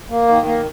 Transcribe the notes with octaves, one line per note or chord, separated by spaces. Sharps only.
A#3
D#3
A#3